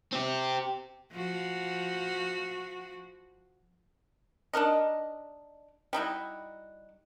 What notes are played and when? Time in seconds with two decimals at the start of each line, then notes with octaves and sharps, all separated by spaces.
0.13 C4 G4
1.12 F3 F#4
4.53 D4 D#4 A#4 D#5
5.93 G3 D#4 E4 F#4